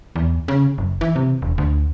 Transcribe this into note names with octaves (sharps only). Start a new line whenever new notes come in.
E2
C#3
F#1
E3
C3
E1
D2